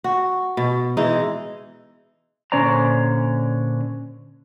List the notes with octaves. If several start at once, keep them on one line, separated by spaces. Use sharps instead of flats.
F#4
B2
E3 G#3 D#4
A#2 D3 C#4 C5 D5 A#5